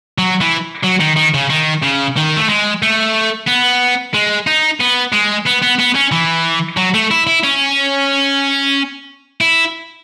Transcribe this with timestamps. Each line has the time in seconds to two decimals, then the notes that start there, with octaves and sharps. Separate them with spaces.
0.18 F#3
0.41 E3
0.84 F#3
1.01 D#3
1.17 D#3
1.34 C#3
1.50 D#3
1.83 C#3
2.17 D#3
2.37 A3
2.49 G#3
2.83 A3
3.47 B3
4.14 G#3
4.47 D#4
4.80 B3
5.12 G#3
5.46 B3
5.62 B3
5.79 B3
5.95 C#4
6.12 E3
6.77 F#3
6.94 A3
7.11 E4
7.27 E4
7.44 C#4
9.41 E4